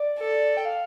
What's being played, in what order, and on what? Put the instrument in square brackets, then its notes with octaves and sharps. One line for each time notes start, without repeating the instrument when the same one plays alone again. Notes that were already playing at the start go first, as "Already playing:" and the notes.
Already playing: [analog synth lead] D5
[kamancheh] A4
[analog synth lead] G5
F5